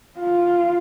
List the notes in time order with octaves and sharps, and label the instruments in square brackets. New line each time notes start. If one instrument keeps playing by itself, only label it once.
[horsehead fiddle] F4